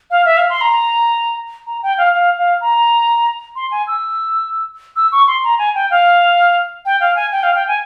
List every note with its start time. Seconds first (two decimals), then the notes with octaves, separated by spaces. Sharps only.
0.11 F5
0.25 E5
0.37 F5
0.50 C6
0.61 A#5
1.66 A#5
1.83 G5
1.98 F5
2.14 F5
2.38 F5
2.61 A#5
3.56 C6
3.71 G#5
3.87 E6
4.96 E6
5.12 C#6
5.27 C6
5.44 A#5
5.59 G#5
5.75 G5
5.91 F5
6.85 G5
7.00 F5
7.16 G#5
7.32 G5
7.43 F5
7.55 G5
7.68 G#5